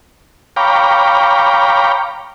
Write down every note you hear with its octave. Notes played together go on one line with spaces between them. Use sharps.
C#5 F5 G5 A#5 B5 D6